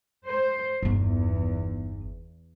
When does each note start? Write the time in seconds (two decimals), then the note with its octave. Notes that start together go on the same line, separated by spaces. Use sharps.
0.25 C5
0.83 G1 E2 D#4